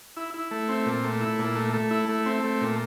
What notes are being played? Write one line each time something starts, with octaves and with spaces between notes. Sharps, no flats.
E4
E4
A3
C4
A#2
A3
E4
A#2
A3
A3
E4
A3
C4
A3
A#2